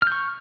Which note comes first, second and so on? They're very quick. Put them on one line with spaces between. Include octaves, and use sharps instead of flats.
F6 G6 C#6